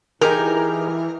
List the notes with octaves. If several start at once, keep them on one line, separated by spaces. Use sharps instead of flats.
E3 D#4 G4 G#4 A#4